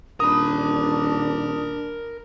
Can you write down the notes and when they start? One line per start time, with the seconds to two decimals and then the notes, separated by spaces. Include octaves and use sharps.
0.20 D#1 D4 A#4 B5 D#6